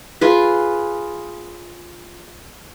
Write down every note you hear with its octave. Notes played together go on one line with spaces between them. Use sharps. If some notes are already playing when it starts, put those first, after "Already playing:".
F4 G#4 B4